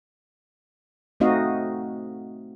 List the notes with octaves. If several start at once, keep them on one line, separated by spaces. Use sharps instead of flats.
A3 C4 D#4 F#4 D#5 F5